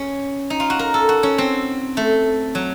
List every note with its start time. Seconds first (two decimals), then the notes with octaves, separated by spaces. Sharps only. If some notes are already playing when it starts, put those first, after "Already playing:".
Already playing: C#4
0.50 D#4
0.60 F4
0.70 F#4
0.79 A#4
0.94 A4
1.09 F#4
1.23 C#4
1.38 C4
1.97 A3
2.55 F#3